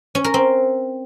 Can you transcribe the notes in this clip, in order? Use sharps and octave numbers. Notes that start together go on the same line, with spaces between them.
C#4
A#4
C4